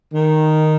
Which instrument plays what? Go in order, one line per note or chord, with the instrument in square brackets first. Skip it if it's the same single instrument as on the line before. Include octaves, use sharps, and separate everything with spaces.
[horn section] D#3